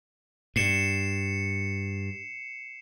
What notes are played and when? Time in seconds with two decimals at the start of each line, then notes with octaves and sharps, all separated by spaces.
0.56 G2 C7 C#7 E7